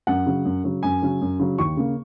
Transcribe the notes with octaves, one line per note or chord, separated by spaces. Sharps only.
F#2 F#5
C#3 F#3
F#2
C#3 F#3
F#2 G#5
C#3 F#3
F#2
C#3 F#3
D#2 C#6
C#3 A#3